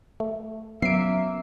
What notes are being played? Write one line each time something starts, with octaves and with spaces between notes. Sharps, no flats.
A3
F#3 A#3 B3 C#4 E5 C7 D7